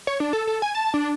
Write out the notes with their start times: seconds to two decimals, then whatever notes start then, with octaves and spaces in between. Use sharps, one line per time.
0.07 C#5
0.20 D4
0.33 A4
0.47 A4
0.62 G#5
0.75 A5
0.94 D4